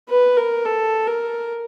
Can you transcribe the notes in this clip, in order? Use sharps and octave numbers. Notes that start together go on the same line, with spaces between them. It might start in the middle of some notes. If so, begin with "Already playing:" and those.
B4
A#4
A4
A#4